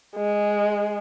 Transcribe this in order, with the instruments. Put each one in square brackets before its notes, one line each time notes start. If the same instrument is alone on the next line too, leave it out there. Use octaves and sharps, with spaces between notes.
[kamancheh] G#3